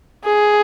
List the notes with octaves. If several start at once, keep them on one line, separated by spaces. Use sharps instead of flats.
G#4